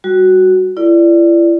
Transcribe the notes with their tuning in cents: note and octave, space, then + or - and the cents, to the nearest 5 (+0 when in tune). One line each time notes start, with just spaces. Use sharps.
G3 +0 F#4 +0
E4 +40 A4 +0 D5 +0